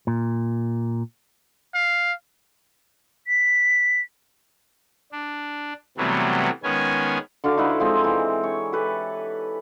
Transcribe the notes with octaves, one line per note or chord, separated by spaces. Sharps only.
A#2
F5
B6
D4
C3 E3 F#3 G3 A3 B3
D#3 G#3 B3 C#4 G#5
D3 D4 F#4 F5
D#4 E4 B4 C5
F3 G#3 C4
E3
C#5
G4 A4 B4